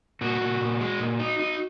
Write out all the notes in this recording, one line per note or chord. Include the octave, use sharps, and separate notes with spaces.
A#2 F#4
A#2
A#2
G#3
A#2
D#4
D#4